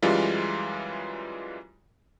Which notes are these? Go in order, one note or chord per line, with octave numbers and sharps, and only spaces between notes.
F#2 E3 G3 G#3 F4